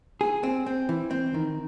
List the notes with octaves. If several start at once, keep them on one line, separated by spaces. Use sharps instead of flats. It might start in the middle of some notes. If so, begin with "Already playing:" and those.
G#4
C4
C4
E3
C4
D#3